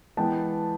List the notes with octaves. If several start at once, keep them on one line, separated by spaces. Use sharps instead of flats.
E3 G#3 B3 G5 A5